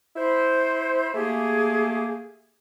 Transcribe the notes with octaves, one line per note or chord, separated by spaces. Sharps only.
E4 C5
A3 A#3 G4 G#4